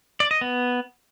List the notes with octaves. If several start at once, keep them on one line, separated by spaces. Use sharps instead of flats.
D5
D#5
B3